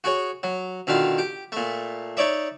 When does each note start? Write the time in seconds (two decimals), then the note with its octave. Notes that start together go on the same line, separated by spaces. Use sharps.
0.04 F#4 G#4 C#5
0.43 F#3
0.87 B2 D3 D#3 F4
1.18 G4
1.52 A#2 A3
2.17 D#4 C#5 D5 E5